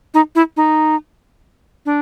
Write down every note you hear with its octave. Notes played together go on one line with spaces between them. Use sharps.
D#4
E4
D#4
D4